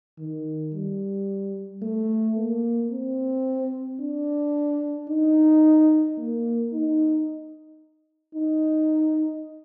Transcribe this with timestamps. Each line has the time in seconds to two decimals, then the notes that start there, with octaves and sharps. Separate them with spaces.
0.19 D#3
0.74 G3
1.82 A3
2.37 A#3
2.91 C4
4.00 D4
5.09 D#4
6.18 A#3
6.73 D#4
8.35 D#4